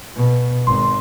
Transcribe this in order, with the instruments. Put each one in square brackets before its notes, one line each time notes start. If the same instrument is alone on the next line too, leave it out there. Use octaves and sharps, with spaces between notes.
[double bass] B2
[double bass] G#1 [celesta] C6